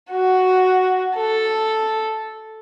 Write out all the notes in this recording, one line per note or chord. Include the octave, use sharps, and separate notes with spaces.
F#4
A4